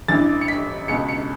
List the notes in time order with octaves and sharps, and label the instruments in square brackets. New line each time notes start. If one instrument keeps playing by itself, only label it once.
[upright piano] A1 G2 E3 A6
C#7
B6
C#2 B2 C#7
C#7